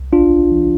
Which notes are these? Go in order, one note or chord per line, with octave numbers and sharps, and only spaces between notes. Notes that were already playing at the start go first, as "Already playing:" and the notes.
Already playing: C2
A1 D4 F4
A1
E3